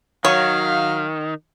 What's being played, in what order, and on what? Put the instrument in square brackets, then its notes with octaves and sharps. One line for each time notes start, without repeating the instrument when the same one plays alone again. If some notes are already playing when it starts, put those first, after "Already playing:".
[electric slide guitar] D#3 [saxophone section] F#3 F5 [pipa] C#5